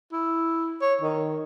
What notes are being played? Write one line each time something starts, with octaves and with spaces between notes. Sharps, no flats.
E4
C#5
D#3